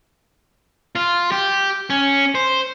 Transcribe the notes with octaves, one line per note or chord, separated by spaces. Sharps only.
F4
G4
C#4
C5